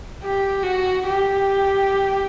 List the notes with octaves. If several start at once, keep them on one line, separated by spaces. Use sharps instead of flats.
G4
F#4
G4